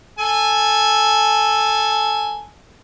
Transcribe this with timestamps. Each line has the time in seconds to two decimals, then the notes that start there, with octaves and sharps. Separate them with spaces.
0.18 A4 G#5